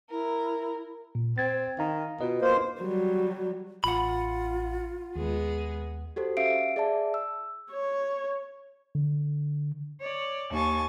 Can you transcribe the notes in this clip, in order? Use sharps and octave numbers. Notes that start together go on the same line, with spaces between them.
E4 A#4
A#2
C4 G#6 A6
D#3 F5 A#5
B2 F4 B4 D#5
A#3 C5
F#3 G3
A1 F4 F#5 B5
D#2 G#3 B3 G#4
F#4 G4 A4 C5
C#4 E5 F5 C7 D7
G#4 D5 E5 A5
E6
C#5
D3
C#5 D5
D#2 G#5 A5 C#6 A6